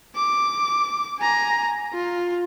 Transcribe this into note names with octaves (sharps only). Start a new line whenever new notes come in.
D6
G#5 A#5
F4